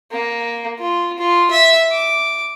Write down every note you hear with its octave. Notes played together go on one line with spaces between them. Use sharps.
A#3
F4
F4
E5
D6